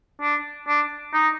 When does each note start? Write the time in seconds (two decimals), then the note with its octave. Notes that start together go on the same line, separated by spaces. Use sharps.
0.21 D4
0.67 D4
1.14 D#4